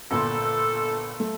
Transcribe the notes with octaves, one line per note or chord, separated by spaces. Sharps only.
G1 A#2 A4 C6
A3